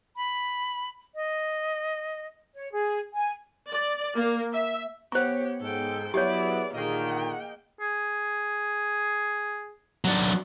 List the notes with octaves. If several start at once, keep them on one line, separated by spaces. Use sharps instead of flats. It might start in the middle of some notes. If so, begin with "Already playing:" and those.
B5
D#5
C#5
G#4
G#5
D5
A#3
E5
B3 G4 C5 C#5 F#5 C#6
G#2 A4 G5
F#3 B3 E4 G4 G#4 B4 C#5 D5
A#2 D3 D#3 A#3 G#4 D#5 G5
G#4
F#3 D4